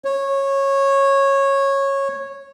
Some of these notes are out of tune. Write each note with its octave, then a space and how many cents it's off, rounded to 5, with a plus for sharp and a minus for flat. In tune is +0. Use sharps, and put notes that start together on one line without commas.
C#5 -15